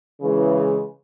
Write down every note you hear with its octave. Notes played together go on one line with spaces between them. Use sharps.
C#3 E3 G#3